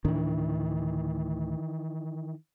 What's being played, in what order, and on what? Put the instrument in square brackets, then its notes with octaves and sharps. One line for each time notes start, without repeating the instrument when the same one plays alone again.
[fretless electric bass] D2 A2 D4 [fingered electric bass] D#3 E3